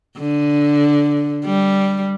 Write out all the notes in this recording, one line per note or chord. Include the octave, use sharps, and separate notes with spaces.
D3
G3